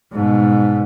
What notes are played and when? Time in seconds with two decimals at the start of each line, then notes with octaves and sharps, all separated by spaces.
0.13 G#2 B2